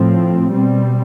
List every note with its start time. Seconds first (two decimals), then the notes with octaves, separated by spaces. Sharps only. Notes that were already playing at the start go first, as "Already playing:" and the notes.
Already playing: A2 F3 C4
0.52 B2 G3 C4